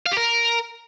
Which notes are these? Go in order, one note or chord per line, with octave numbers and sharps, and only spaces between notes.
F5
G4
A#4